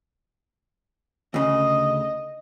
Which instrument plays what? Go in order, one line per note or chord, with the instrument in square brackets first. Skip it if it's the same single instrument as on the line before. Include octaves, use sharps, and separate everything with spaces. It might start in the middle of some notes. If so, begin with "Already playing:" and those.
[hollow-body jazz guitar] D2 C#3 [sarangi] D#5